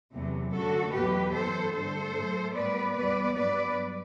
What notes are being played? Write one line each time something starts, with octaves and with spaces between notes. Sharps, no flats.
E2 C3 F#3 A3
F#2 D3 F#3 A3 F#4 A4
E2 B2 F#3 A3 G4 B4
F#2 E3 B3 A4 C5
G2 D3 A3 A4 C5
A2 F#3 A3
A2 G3 B3 B4 D5
E2 B2 G3 B3 B4 D5
G2 F#3 B3 B4 D5